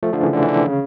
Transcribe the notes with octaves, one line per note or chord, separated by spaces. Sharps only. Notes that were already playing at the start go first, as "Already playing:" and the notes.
F3 A3
D3 F3
C#3 E3
D3
E3
D3
C#3